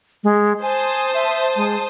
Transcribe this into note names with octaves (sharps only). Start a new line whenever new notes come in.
G#3
C5 G#5 A5 D#6
E5
G#3